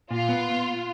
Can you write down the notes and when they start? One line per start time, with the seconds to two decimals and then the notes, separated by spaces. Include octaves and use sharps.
0.11 A#2 F4
0.29 B3